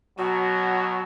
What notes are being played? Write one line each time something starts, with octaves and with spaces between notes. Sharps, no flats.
B2 F#3 F#4